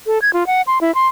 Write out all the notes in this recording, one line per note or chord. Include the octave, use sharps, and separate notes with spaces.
A4
G#6
F4
F#5
C6
E4
C6